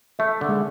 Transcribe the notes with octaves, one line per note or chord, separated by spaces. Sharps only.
A3 E5
D3
G#3